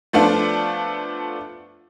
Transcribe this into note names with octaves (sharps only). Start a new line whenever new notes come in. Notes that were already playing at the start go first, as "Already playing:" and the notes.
F3 A3 B3 D4 F4